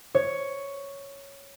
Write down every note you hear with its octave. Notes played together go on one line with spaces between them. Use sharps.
C#5